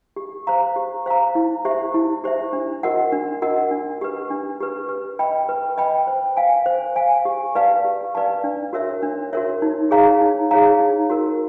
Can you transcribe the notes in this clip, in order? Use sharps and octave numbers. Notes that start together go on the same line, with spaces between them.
G4
C5 F5 A#5
G4
C5 F5 A#5
E4
G4 C5 E5
E4
G4 C5 E5
D4
F#4 A#4 D#5 F#5
D4
F#4 A#4 D#5 F#5
D4
G4 B4
D4
G4 B4
B4
D#5 G5 B5
B4
D#5 G5 B5
C5
F5 G#5
C5
F5 G#5
G4
B4 D5 F5 A5
G4
B4 D5 F5 A5
D4
F#4 A#4 C#5 E5
D4
F#4 A#4 C#5 E5
D#4
G#4 C#5 F5 A#5
D#4
G#4 C#5 F5 A#5
D#4
F#4 A#4